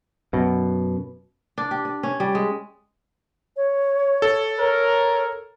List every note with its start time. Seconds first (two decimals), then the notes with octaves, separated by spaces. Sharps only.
0.33 F#2 B2
1.58 D4
1.71 G4
1.85 D5
2.03 C#4
2.20 G3
2.35 G#3
3.57 C#5
4.22 A4
4.59 A#4 C#5